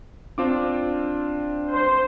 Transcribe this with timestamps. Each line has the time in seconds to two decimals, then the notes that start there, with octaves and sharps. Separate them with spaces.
0.38 C4 D4 F4 D6
1.73 C5